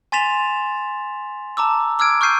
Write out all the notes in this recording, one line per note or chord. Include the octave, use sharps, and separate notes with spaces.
G#5 C6 A6 B6 E7 F7
A5 A#5 D6 E6
D6 E6 F6 G#6 D7
C#6 F6 G6 C7 D#7